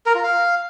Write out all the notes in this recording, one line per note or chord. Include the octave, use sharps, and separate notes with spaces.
A#4
F4
F5